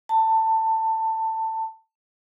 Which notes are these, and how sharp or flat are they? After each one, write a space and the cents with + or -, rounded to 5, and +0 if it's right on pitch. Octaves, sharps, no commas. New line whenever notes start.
A5 +20